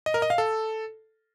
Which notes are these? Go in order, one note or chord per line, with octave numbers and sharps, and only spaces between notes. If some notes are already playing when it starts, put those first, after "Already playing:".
D#5
A#4
D#5
F5
A4